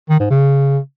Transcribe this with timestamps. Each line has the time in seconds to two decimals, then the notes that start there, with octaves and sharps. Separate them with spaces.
0.09 D#3
0.20 G#2
0.30 C#3